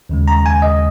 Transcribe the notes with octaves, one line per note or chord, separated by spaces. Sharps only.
D#2 C#3 G#3
A#5
G#5
D#5